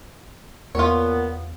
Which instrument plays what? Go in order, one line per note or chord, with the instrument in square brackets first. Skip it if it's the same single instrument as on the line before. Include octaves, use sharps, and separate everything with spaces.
[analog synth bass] E2 [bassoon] A#2 [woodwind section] B3 [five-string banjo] F4 C#5